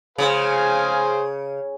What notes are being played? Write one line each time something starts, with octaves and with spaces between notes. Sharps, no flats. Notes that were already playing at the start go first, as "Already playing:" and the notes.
C#3 G#4 C5 F5 G#5